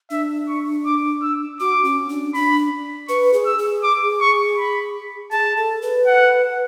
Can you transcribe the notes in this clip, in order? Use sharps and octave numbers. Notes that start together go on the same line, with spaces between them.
D4 E5
C#6
D6
E6
F#4 D6
C#4
D4
D4 B5
B4 C#6
G#4
E6
G#4
D6
C#6
B5
G#4 A5
A4
B4
F#5